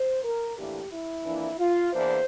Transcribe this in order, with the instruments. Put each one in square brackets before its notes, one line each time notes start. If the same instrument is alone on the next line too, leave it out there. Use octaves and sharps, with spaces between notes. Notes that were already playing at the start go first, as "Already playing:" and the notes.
Already playing: [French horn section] C5
A#4
A2 E3 A#3 D4 G4
E4
F2 E3 A#3 D4
F4
E2 E3 A#3 D4 C5